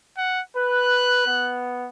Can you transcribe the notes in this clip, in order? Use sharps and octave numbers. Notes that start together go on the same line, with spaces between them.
F#5
B4 F#6
B3